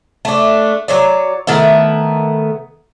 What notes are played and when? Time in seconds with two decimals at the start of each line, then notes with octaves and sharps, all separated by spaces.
0.25 A3 D4
0.88 F#3 C#5 D5
1.47 D#3 A3 B3 E4